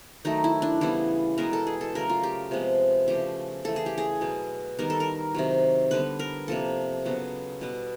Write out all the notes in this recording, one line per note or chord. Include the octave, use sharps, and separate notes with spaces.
D#3 F#3 A3 D#4
E4
D4
C#3 E3 G3 B3 E4
B2 G#3 B3 A#4
A4
G#4
A4
C#3 F#3 A3 A#4
F4
G4
C3 F3 G#3 B3
C#3 F3 A3 G4
C#3 E3 A3 A4
G#4
G4
G#4
B2 F#3 B3
D#3 G3 B3 A#4
A4
A#4
C3 D#3 F#3
D3 G3 B3 B4
A#4
C3 F3 A#3 A4
C#3 F#3 B3
B2 G3 B3